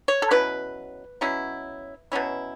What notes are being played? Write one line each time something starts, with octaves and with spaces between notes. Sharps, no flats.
C#5
A4
B2 F#3 C#4 E4 B4
B2 F#3 C#4 E4
B2 F#3 C#4 E4